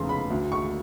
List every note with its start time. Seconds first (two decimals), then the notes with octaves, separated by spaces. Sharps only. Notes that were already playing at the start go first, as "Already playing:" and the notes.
Already playing: F1 E2 C#3 C6
0.09 B5
0.30 D2
0.52 C#6